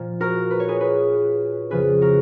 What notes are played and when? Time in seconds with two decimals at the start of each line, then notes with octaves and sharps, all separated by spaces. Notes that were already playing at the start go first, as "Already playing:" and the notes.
Already playing: A#2 F3
0.20 F#4 A#4
0.50 B4
0.60 C#5
0.68 G#4 B4
0.80 G#4 B4
1.71 F2 C#3 F3 G#4 B4
2.01 F#4 A#4